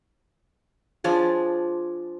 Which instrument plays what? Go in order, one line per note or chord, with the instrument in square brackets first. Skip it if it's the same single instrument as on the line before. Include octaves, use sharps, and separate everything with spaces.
[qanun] F3 D4 G#4